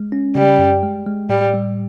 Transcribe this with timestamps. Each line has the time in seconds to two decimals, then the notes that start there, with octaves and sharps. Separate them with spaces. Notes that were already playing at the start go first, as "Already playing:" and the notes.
Already playing: G#3
0.12 C#4
0.35 C#3 G3
0.59 F#2
0.83 G#3
1.07 G#3
1.29 A2 G3
1.54 G3